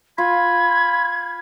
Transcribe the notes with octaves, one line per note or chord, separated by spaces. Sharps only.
F4 B5 G#6